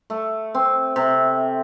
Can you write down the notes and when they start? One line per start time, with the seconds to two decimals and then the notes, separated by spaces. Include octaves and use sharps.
0.10 A3
0.54 C4
0.96 C3